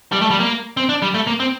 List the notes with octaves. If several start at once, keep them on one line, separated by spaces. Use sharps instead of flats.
G3
A3
G3
A#3
C4
D4
G3
A3
A#3
C4